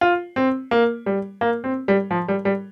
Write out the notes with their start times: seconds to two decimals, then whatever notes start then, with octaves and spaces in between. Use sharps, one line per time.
0.01 F4
0.36 C4
0.71 A#3
1.06 G3
1.41 A#3
1.64 C4
1.88 G3
2.11 F3
2.28 G3
2.45 G3